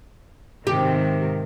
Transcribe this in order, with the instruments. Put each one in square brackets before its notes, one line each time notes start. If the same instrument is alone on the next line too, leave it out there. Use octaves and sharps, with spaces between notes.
[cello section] G#2 C3 D#3 [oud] G4